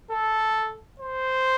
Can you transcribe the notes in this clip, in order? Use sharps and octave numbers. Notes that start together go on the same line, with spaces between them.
A4
C5